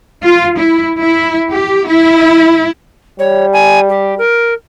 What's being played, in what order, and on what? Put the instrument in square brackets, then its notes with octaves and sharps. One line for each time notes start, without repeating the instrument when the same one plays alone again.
[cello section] F4
E4
E4
G4
E4
[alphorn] G3 [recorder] C#5
[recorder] G#5
G4
A#4